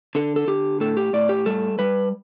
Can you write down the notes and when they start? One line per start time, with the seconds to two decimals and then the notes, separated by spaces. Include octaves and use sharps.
0.15 D3 A4
0.36 A4
0.48 D3 G4
0.80 A2 A4
0.97 G4
1.13 A2 D5
1.29 G4
1.46 G3 A4
1.79 G3 B4